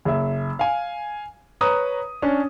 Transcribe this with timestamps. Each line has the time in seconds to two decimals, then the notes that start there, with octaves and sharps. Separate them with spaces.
0.05 F#1 E5
0.59 F5 G#5
1.61 B4 C#5 A#5 D#6
2.22 C#4 D4 C#5